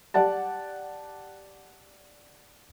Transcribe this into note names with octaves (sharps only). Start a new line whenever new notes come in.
G4 D5 F#5 A5